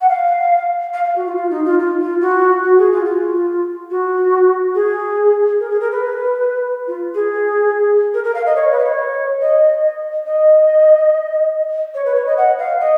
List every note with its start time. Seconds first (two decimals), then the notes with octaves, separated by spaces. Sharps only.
0.01 F#5
0.09 F5
0.93 F5
1.04 F5
1.15 F#4
1.26 F4
1.36 F4
1.50 D#4
1.65 F4
1.79 F4
2.00 F4
2.20 F#4
2.62 F#4
2.78 G#4
2.92 F4
3.05 F4
3.90 F#4
4.74 G#4
5.59 A#4
5.70 G#4
5.80 A#4
5.91 B4
6.87 F4
7.14 G#4
8.14 A#4
8.24 A#4
8.34 F5
8.46 D#5
8.55 C#5
8.71 B4
8.79 D#5
8.84 C#5
9.41 D#5
10.25 D#5
11.94 C#5
12.05 B4
12.15 C#5
12.26 D#5
12.37 F#5
12.58 F5
12.80 D#5